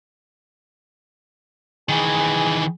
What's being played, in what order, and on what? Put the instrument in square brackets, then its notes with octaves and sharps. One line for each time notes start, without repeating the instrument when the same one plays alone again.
[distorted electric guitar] D#3 E3 [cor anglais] G#4